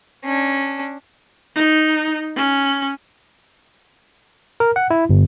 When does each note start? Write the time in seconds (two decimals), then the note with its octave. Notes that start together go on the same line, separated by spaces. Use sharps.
0.24 C#4 D4
1.55 D#4
2.36 C#4
4.60 A#4
4.76 F#5
4.91 E4
5.09 G1